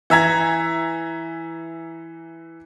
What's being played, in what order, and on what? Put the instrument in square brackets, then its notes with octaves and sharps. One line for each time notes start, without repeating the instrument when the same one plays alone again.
[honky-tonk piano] E3 E5 A#5 G#6